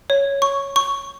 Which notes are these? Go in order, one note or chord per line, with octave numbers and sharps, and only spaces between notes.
C#5
C#6
C#6